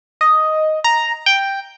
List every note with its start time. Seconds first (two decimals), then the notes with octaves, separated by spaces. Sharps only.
0.21 D#5
0.84 A#5
1.26 G5